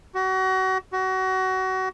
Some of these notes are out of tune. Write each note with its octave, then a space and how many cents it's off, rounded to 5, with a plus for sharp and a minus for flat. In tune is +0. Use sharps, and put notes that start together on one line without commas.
F#4 +30
F#4 +25